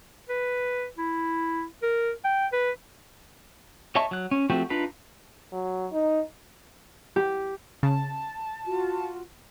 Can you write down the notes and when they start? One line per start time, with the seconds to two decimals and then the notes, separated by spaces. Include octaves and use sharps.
0.29 B4
0.98 E4
1.83 A#4
2.25 G5
2.53 B4
3.95 C#5 D#5 E5 A5 C#6
4.11 F#3 F#6
4.31 C#4
4.50 F3 A3 C4 F#4 G4
4.70 D4 D#4 F4 B4 B5
5.53 F#3
5.92 D#4
7.16 G4
7.83 C#3 A5
8.66 F4 F#4